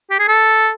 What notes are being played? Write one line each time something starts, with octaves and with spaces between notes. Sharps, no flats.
G4
G#4
A4